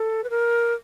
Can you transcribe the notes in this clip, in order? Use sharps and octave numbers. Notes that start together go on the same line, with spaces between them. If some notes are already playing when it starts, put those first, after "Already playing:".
Already playing: A4
B4
A#4